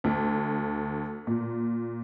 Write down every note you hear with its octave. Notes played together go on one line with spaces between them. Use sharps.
D2
A#2